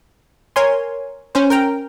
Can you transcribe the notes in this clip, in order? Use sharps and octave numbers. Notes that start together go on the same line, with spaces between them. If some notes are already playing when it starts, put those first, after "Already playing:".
A#4 C#5 G#5 C6
C#4 C5
A#4 G5 A#5